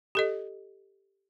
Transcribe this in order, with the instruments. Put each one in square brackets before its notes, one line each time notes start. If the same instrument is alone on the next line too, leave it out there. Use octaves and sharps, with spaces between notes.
[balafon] G4 A4 D#5